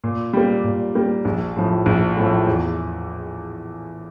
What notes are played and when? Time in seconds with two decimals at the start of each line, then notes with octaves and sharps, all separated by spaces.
0.04 A#2
0.33 G3 A#3
0.64 A#2
0.95 G3 A#3
1.25 A#1
1.56 A2 F3
1.86 A#1
2.16 A2 F3
2.47 E2